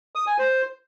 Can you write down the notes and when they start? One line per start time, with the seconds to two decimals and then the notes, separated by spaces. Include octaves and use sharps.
0.15 D#6
0.27 G#5
0.39 C5